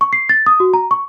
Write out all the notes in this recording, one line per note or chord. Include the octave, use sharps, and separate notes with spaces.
C#6
C7
A6
D#6
F#4
A#5
C#6